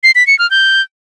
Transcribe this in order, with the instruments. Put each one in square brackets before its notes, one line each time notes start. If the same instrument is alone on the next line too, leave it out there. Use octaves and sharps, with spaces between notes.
[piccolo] C7
B6
C#7
F6
G6